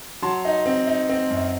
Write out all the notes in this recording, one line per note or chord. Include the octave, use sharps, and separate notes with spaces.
F#3 A5 C6
D#4
C4
D#4
C4
F#2